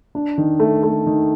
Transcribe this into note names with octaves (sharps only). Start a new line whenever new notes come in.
D4
D#3
A3
A3
D#3